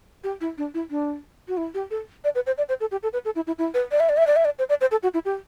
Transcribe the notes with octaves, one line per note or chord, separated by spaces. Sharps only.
G4
E4
D4
E4
D4
F#4
E4
G4
A4
D5
B4
C5
D5
C5
A4
G4
A4
B4
A4
E4
E4
E4
B4
D5
E5
D5
E5
D5
E5
D5
C5
D5
C5
A4
F#4
E4
G4